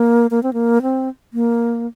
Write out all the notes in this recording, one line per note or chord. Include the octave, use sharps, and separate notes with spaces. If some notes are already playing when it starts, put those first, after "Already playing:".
Already playing: A#3
A#3
C4
A#3
C4
A#3